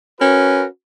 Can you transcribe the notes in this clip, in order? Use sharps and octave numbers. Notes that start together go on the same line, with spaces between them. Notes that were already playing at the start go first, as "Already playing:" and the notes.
C#4 F#4 A#4 B4